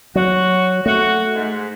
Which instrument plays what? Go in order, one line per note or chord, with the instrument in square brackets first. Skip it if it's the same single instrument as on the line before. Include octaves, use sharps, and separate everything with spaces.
[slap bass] F#3 [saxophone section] F#4
[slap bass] A3 [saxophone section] F#4
[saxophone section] G#2